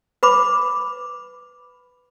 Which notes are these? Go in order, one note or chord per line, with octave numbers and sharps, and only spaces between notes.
B4 B5 D6